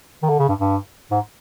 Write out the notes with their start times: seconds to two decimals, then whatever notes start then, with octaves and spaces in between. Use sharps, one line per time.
0.23 D#3
0.29 D3
0.39 C#3
0.49 G2
0.59 G2
1.11 G#2